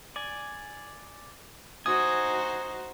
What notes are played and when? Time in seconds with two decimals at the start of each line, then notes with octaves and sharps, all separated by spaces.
0.16 D5 G#5
1.86 D#4 F#4 C5 G#5 D#6